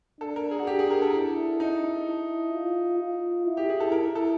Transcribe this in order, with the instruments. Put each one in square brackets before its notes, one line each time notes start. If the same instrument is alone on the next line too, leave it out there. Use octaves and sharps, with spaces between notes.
[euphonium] D4 [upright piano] A4
[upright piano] A#4
G#4
F#4
G4
G#4
A#4
A4
[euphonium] E4
[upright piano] D#4
[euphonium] E4
F4
F4
E4
[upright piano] G4
G#4
A4
[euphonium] E4 [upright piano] A#4
[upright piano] A4